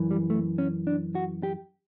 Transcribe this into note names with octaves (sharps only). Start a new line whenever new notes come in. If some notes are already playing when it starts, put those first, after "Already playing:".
Already playing: F#2 E3
G3
A3
C#4
D4
F#4
G4